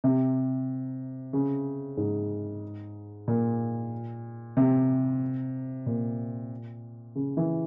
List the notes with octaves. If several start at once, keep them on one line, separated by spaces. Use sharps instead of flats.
C3
C#3
G#2
A#2
C3
A#2
C#3
E3